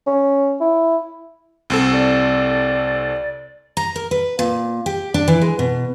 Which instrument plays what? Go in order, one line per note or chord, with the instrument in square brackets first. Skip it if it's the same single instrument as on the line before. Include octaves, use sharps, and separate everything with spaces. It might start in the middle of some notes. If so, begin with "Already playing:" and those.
[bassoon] C#4
E4
[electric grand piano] C2 C4 A4
[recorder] D5
[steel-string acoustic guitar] A#5
A#4
B4
A#2
G4
D4
E3
G#3
B2